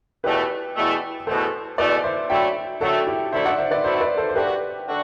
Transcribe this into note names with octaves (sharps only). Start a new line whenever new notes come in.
E2 B2 A3 G4 B4
E2 B2 A3
E2 B2 A3 A4 C5
E2 B2 A3 B4 D5
C5 E5
D3 F#3 A3 E4 E5 G5
D3 F#3 A3 E4 F#4 A4
E4 G4
D3 F#3 A3 E4 C5 E5
D5 F#5
C5 E5
B4 D5
D3 F#3 A3 E4 C5 E5
B4 D5
A4 C5
C5
G2 D3 A3 D4 F#4 G4 B4
D3 A3 D4 F#4